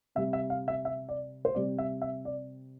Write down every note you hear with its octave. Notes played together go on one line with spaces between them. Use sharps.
C3 G3 E5
E5
F5
E5
E5
D5
C5
C3 G3 D5
E5
E5
D5